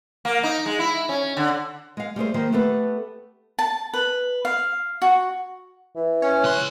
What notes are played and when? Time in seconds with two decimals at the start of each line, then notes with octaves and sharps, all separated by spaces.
0.25 A#3
0.43 D#4
0.66 G#3
0.79 E4
1.09 C#4
1.37 D3
1.97 G#3 F5
2.16 G3 A3 G#4 C5
2.34 D#3 F3 A#3 C5
2.52 A3 B3 G4 A4 B4
3.59 A5
3.94 B4
4.45 F5
5.02 F#4
5.96 E3
6.22 C#4 C#5
6.44 C#2 C6 F#6